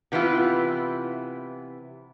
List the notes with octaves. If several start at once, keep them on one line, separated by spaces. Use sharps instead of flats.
C3 E3 B3 E4 F4